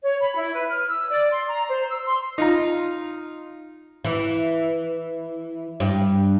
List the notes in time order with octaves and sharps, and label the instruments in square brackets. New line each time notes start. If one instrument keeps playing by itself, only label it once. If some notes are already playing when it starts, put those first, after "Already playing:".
[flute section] C#5
B5
E4
B4
F6
E6
D5
C6
A#5
C5
E6
C6
[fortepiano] D#4 F4 A#5
[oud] E3
G2